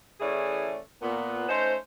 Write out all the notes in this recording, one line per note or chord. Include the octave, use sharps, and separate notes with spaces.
A2 E3 A3 C#4 G#4 D5
A#2 B3
A3 C#4 D#4 C5